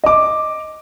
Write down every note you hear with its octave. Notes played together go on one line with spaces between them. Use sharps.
D#5 D6